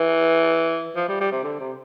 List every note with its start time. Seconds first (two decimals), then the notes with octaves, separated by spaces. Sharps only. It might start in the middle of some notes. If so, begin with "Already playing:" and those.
Already playing: E3
0.96 F3
1.09 G3
1.20 G3
1.32 C3
1.44 D3
1.60 C3